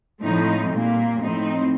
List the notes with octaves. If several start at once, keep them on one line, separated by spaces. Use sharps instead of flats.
A2 F3 A3 C4 D#4
A#2 G3 A#3
A2 F3 C4 D#4